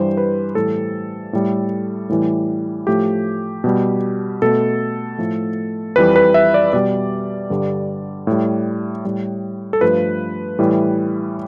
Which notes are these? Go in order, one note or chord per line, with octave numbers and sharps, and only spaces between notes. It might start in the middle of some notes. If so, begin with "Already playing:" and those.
Already playing: G2 E3 G3 C5
B4
A2 E3 G3 A4
A2 G3
A2 E3 G3
A2 F3 A3 G4
B2 G3
B2 A3 A4
A2 F3 A3
F2 E3 G3 B4
B4
E5
D5
B2 G3 D5
G2 D3 G3
A2 G3
A2 G3
A4
G2 F3 A3 B4
A2 E3 G3